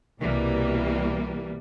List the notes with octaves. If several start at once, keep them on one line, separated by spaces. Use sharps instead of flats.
C2 B2 E3 G3 A#3